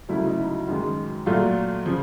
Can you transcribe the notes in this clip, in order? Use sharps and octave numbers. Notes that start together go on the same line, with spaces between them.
D2 C#3 F#3 A3 E4
D#4
E4
F#2 D#3 G#3
A#2 F#3 A3 F4
C#3 F3